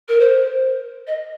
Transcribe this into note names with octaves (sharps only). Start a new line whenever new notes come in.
A#4
C5
D#5